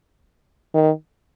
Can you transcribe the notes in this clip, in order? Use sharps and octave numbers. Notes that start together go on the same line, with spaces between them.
D#3